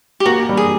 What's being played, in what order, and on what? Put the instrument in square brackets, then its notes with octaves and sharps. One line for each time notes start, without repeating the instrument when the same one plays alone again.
[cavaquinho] G4
[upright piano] A#3 [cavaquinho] F#4
[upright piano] G3
[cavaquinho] G#4